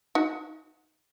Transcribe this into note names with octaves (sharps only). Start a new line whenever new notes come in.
D#4 F#4